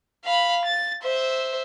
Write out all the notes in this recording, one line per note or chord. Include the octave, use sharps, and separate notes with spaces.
F5 B5
A6
C5 E5